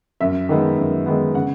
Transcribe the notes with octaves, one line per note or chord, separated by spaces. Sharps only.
F#2 E5
D#3 G#3 B3
F#2
D#3 G#3 B3
C#3 F#5